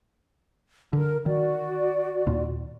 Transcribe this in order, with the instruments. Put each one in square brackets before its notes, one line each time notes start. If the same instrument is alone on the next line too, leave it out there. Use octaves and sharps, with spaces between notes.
[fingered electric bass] D3 [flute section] A#4
[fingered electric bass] D#3 [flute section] F#4 D5
[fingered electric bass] D#2 A#2